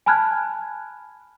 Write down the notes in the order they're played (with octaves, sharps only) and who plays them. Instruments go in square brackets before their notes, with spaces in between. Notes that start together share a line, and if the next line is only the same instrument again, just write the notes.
[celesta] G#5 A5 B5 F6 F#6 G#6